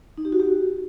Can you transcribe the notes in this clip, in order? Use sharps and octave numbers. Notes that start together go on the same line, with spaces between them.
D#4
G4
F#4
G4